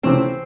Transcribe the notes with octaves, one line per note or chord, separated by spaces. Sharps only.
C#2 C3 E3 A3 C4 C#4